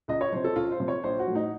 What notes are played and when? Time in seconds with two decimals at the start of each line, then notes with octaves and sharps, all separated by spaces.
0.08 C#2 D#5
0.21 C#5
0.32 C3 F3 C5
0.44 A4
0.56 C#2 F4
0.72 C5
0.80 C3 F3
0.88 C#5
1.04 A#1 C5
1.19 F#4
1.27 A2 F3
1.35 D#4